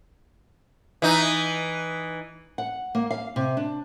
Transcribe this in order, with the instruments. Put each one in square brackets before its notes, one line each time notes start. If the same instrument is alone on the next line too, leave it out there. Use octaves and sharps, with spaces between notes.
[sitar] E3 D#4
[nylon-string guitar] F#5
A#3
F5
C3
D4